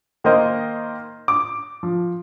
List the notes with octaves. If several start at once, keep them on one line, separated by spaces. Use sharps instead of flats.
D#3 A#3 D#4 A#4 C5 D#5
D6
F3